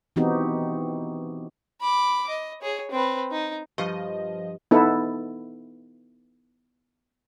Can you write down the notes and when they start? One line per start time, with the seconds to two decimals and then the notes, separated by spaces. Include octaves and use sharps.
0.16 E3 B3 C4 D#4 F#4 G4
1.81 B5 D6
2.29 D#5
2.62 G#4 C#5
2.91 C4 B4
3.32 D#4
3.78 G2 F3 D#5
4.71 B3 D#4 E4 A4